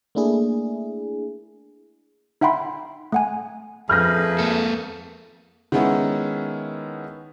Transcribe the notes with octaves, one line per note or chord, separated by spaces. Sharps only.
A3 A#3 D4 E4 G#4
D#4 E5 F#5 G5 B5 C6
A3 F#5 G#5
F2 A3 G#4 B4 F6 G6 A#6
A#3 A4
D#3 G#3 B3 C#4 E4